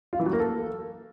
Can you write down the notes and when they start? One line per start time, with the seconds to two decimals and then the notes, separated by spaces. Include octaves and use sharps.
0.13 F4
0.19 E3
0.26 F#3
0.33 A#3
0.40 A4